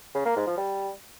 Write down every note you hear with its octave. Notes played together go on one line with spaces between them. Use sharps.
C#3
A#3
G#2
F3
G3